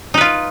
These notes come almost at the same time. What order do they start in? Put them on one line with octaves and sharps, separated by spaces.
D#4 B4 F4